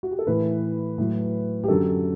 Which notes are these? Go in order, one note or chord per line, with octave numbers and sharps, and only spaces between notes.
F#4
G4
A4
A2 E3 B4
A2 F#3
G4
F#2 D3 F#3 A4